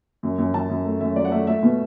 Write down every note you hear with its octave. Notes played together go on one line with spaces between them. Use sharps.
F#2
F#2
F#2 A5
F#2
A3
F#2 E5
F#3 D5
F#5
A3 E5
A3 E5
B2